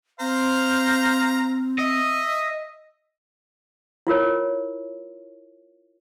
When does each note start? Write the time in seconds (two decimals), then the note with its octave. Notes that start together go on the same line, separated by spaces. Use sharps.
0.20 C4 C5 F5 A#5
1.79 D#5 E5
4.07 E4 F4 A#4 C#5